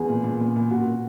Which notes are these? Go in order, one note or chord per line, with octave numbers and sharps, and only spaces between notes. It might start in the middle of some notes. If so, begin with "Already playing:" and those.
Already playing: E2 G#4
A#2
A#2
A#2
A#2
A#2 F#4
A#2